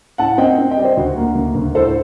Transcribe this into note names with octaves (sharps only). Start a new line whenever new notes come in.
A2 F#5 A5
C4 D#5 G5
C4
D#5 G5
G3 D5
C5 D#5
D2 F#4
A#3
D2
D2
A2 A4 C5